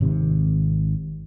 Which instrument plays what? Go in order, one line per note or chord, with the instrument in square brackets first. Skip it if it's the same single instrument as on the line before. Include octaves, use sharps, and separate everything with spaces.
[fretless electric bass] G#1 C3 D#3